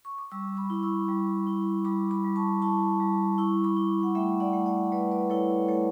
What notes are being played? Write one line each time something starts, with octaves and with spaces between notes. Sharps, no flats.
C#6
D6
G3 C#6 E6
B5 D6
E4
C#6 E6
G3
E4
G3 B5 D6
B5 D6
G3
A5 C#6
E4 A5 C#6
G3
E4 C#6 E6
B5 D6
E4
F#5
A3 E5 G5
D5 F#5
A3
D5 F#5
A3 B4 D5
B4 D5
E4 A4 C#5
A3 A4 C#5